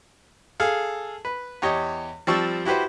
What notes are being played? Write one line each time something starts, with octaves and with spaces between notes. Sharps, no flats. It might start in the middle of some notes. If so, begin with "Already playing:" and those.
G#4 A4 F5
B4
E2 G4 C#5 D#5
F3 G3 C4 A5 C#6 E6
E4 F#4 G4 B4 C5